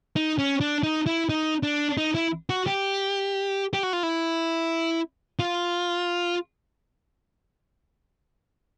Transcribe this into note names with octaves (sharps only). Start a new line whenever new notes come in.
D#4
C#4
D4
D#4
E4
D#4
D4
D#4
E4
F#4
G4
G4
F#4
F4
E4
F4